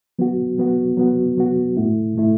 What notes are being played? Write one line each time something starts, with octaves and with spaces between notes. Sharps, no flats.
F#3 B3 F#4
F#3 B3 F#4
F#3 B3 F#4
F#3 B3 F#4
A2 A3 E4
A2 A3 E4